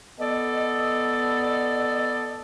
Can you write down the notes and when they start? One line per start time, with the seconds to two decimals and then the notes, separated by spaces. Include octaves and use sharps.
0.20 B3 A4 D5 D#5